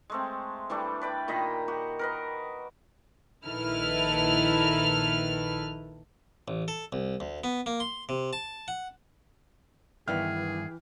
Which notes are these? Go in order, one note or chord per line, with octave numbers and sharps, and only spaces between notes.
G#3 A3 C4
E3 G3 A3 D4
B4 D5 G5
A#2 D#3 D#5 B5
F#4 G4
A#4 B4 D#5
A#1 D#3 E4 A4 B4 F6
A1
A4
C2
D2
B3
A#3
C6
C3
A5
F#5
G2 D#3 E3 B3 G#4 E5 G5 F6